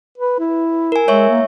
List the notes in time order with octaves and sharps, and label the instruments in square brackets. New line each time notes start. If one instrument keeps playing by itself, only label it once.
[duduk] B4
E4
[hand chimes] A#4 G#5
[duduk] G#3 [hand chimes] C#5 E5 C#6
[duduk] A#3